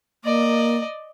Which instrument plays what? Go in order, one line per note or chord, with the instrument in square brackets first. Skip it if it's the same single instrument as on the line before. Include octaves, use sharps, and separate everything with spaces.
[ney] A#3 [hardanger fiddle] D5 D#5